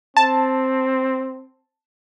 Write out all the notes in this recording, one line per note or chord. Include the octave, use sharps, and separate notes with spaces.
C4 A5